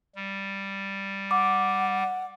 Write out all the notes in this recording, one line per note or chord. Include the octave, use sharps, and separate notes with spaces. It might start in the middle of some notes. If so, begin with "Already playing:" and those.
G3
F#5 D6